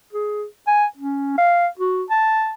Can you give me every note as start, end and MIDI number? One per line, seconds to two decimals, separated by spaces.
0.13 0.45 68
0.67 0.85 80
0.97 1.34 61
1.38 1.67 77
1.79 2.03 66
2.10 2.54 81